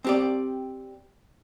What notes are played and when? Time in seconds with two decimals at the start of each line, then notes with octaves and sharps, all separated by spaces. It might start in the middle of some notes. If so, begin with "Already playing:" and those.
0.04 C4 G4 D5